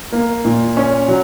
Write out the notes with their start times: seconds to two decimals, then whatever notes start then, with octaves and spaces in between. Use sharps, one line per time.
0.12 A#3
0.45 A#2
0.77 C#4
1.08 F#3